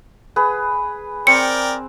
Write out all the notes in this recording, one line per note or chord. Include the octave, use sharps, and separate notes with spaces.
G#4 B4
C4 A#4 D5 G5 C#7